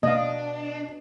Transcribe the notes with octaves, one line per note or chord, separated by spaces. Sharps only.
B2 D4 D#5 F5